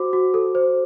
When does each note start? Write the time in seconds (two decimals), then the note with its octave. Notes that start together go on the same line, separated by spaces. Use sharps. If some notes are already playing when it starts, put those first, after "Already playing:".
Already playing: F#4 C5 D6
0.13 F#4
0.34 A4
0.55 C5